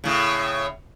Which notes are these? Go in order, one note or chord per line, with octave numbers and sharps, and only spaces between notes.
A2 C#3